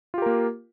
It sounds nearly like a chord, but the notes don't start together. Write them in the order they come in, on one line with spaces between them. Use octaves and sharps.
F4 G4 A#4 A#3